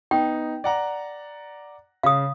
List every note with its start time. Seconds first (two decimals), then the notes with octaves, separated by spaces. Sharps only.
0.11 B3 D#4 G5
0.64 D5 F#5 A#5
2.03 C#3 F5 D#6